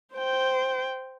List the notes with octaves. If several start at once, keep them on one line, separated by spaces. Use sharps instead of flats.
C5 G5